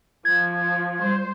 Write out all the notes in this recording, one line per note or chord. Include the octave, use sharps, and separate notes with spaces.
F3 G#6
G3 C5